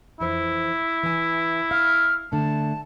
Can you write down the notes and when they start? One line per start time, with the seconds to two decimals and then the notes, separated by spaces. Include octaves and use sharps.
0.20 F2 E3 E4 C5
1.03 E3 G#5
1.71 F5 F6
2.32 D3 A3 A5